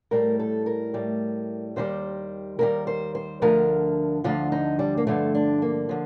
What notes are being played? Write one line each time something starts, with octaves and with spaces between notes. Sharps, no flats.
A2 G3 A#4
A4
A#4
A2 G3
D#2 D#3 G3 C5
D#2 D#3 G3 A#4
C5
C5
D2 D3 F3 A#4
D2 D3 F3 F4
D#4
G3
A#3
G2 D3 F3 A3
D4
A#3
D3 F3